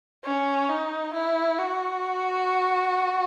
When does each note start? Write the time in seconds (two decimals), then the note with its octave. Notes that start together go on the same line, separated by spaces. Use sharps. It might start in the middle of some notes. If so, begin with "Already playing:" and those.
0.24 C#4
0.69 D#4
1.13 E4
1.59 F#4